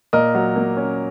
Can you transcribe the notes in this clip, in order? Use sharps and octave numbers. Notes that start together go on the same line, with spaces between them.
A#2 A#4 D#5
F#3
A#3
C#4